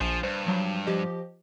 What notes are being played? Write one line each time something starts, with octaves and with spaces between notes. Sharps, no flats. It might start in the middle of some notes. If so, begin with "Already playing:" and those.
A#1 F3 G#5 C7
G2 C5
F3 F#3
F3 G4 D#5